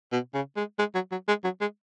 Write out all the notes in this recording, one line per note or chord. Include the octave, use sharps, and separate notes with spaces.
B2
C#3
G#3
G#3
F#3
F#3
G#3
F#3
G#3